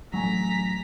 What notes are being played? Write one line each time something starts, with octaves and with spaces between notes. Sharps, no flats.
A1 F#3 A3 G#5 A#5 B6